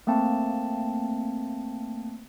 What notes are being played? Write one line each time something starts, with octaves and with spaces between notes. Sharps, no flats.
A3 A#3 C4 A5